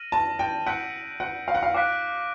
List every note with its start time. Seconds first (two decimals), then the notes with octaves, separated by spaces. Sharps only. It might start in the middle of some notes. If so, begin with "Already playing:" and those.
Already playing: F6 A#6 D#7 F#7
0.12 A5
0.39 G5
0.66 F#5 E6 G6 B6 D7
1.20 F#5
1.48 F5
1.55 F#5
1.63 F5
1.74 F5 D6 F#6 B6 D7